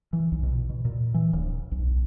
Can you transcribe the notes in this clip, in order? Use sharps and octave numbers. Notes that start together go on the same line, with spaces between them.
E3
B1
B2
B2
A#2
E3
D1
B1